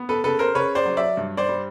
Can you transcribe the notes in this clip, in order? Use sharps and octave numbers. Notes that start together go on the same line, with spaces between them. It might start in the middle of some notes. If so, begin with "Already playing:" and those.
Already playing: B3
A4 B4
C#3 A4 B4
A#4 C5
C#3 B4 C#5
C5 D5
F#3
D5 E5
G2
C5 D5
G3